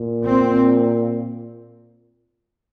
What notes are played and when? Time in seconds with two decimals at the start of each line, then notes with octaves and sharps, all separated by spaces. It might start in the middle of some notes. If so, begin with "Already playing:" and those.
Already playing: A#2
0.25 C4